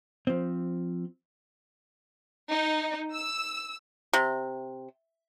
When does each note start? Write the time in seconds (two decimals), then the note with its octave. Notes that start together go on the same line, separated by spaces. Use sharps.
0.27 F3 C4
2.50 D#4
3.12 E6
4.13 C3